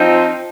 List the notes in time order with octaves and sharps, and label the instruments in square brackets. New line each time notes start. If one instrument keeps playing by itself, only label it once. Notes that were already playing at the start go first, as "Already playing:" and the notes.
Already playing: [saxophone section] F3 C4 D#4